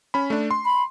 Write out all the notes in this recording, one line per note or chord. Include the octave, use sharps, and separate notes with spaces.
C#4 B5
A3 D4
C6
B5